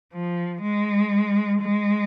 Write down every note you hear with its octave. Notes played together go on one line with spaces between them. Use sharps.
F3
G#3
G#3